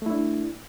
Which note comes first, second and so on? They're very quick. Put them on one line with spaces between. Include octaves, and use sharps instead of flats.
A3 E4 D4